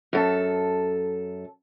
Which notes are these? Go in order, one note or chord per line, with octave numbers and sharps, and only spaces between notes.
F#2 A4